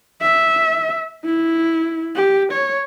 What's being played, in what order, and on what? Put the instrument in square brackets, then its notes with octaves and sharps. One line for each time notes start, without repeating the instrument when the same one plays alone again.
[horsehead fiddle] E5
E4
G4
C#5